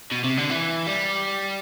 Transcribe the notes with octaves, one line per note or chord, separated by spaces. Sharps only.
B2
C3
D3
E3
G3